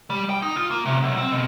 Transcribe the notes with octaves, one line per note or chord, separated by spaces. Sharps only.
G3
G5
D#4
F4
A#3
C3
B1
C4
B2